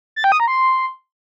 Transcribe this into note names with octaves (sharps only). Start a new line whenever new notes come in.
A6
G5
D#6
A#5
C6